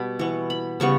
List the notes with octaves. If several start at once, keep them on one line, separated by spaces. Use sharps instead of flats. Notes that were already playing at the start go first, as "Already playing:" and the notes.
Already playing: B2 G3 B5
E3 B3 C#6
B5
C#3 G3 B3 C#6